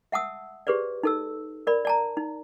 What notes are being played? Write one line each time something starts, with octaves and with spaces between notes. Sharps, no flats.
E5 F#5 A5 D#6 E6
G4 G#4 B4 C5 D5
D#4 A4 E6
A#4 D5 B5
D5 A5 A#5
D#4